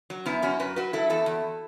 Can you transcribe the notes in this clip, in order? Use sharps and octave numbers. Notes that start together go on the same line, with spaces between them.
F#3
F#2 B3 E4
F#2 C#4 F#4
F#2 F#4 B4
F#3 F#4 B4
F#3 E4 A4
E2 E4 A4
E2